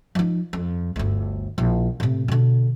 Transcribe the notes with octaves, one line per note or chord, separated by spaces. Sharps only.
F3 D#4
F2
G1 D2
A#1 E4
A2 C3
B2 D3